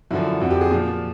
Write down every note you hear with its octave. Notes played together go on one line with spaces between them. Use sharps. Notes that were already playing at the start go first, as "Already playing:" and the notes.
F#2 D3 F3 E4
F2 D3 F3 F#4
G4
G#4
A#2 F3